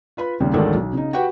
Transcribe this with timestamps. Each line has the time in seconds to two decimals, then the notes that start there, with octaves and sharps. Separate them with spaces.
0.17 F4 B4 B5
0.40 D#2 C#3 G3
0.53 A1 D2 D#3 G#3 D4 A4
0.74 B1
0.93 C#3 D#4
1.13 F#4 G4 B4 F#5 G5